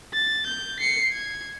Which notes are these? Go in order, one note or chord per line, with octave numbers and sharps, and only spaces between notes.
A6
G6
C7 C#7
G#6